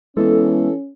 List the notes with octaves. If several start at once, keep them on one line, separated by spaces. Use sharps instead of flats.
E3 G#3 B3 C#4 A4